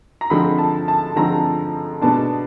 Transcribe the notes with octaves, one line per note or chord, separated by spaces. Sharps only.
A#5
D3 F3 G#3 C4 B5
A5
A5
D3 F3 G#3 C4 A#5
B2 G#3 B3 D4 A5